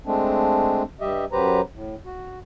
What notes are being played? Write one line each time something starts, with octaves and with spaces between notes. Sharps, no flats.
G#3 A3 C4 D4
G2 G3 G4 D#5 E5
F#2 F#3 G4 B4 C5 A#5
A2
F#4